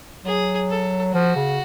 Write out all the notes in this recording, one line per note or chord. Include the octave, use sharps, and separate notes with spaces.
F#3 G#4
A4
F3 F#4
C#3